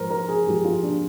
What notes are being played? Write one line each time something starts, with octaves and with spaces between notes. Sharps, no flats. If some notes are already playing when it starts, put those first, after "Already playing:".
Already playing: G#2 F3 A#4 C5
A#4
G#4
G#2 F3 G4
F4
D4